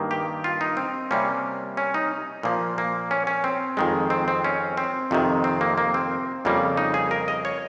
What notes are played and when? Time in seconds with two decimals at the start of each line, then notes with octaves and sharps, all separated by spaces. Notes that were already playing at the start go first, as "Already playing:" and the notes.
Already playing: G2 D#3 A#3
0.11 G4
0.44 F4
0.61 D#4
0.77 C4
1.11 C3 G3 A#3 C#4
1.77 C#4
1.94 D#4
2.43 A#2 F3 A#3
2.78 A#3
3.11 C#4
3.27 C#4
3.44 C4
3.77 F2 D#3 G#3
4.10 C4
4.28 C4
4.44 C#4
4.77 C4
5.11 F2 C3 D#3
5.44 C4
5.61 A#3
5.78 A#3
5.94 C4
6.45 F2 C#3 G3 A#3
6.77 D#4
6.94 G#4
7.11 A#4
7.28 D#5
7.45 C#5